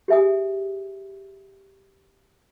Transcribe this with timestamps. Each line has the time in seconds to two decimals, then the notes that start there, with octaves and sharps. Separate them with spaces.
0.08 G4 G#4 E5 G#5 D#6